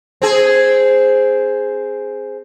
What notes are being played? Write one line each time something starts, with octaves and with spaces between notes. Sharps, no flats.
C4 G#4